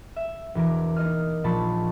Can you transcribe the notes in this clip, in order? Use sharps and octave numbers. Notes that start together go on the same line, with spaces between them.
E5
E1 E3 A#4 D6
A#3 D#4 D#5 D#6 F6
A#1 A#2 F3 A5 B5 C#6